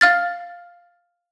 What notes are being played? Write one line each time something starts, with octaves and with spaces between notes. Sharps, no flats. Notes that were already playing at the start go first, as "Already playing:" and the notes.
F5 F6 A6